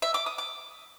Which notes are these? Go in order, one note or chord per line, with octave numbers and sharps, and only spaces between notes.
E5
D6
D#6
D6